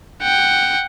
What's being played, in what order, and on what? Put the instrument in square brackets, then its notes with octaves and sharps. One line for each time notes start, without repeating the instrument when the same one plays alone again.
[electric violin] F#5 G5